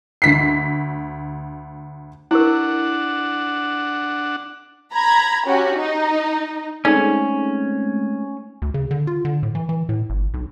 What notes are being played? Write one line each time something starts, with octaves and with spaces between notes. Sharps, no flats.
D2 B6 C7
D4 E4 G4 A#4 F#5
A#5 B5 G#6
C#4 F#4 G4
D#4
G#3 A3 C4 C#4 D#4 D5
D2
C#3
D3
F4
D3
A2
E3
E3
A2
G1
B1